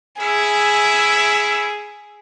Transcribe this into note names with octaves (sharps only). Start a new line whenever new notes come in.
C#4 E4 G#4 E5